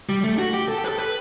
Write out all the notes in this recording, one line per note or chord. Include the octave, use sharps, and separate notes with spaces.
G3
A3
F#4
G4
A4
G4
B4
A4
B4